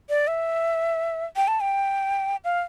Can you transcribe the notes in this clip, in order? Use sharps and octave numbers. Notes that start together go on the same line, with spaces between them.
D5
E5
G5
A5
G5
F5